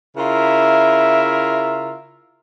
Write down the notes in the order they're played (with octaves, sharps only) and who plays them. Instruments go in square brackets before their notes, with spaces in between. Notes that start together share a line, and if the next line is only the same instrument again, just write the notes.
[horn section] C#3 E4 F4 A#4 E5